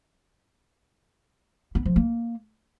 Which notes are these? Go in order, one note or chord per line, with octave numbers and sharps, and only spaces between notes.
B3
F3
A#3